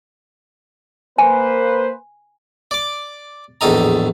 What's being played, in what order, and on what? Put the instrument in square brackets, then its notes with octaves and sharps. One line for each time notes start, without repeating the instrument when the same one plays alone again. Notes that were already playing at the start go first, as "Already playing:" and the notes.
[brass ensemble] A#3 B4 C5 [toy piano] G#5
[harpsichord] D5 D6
A#1 E2 A2 A4 D#5 A#5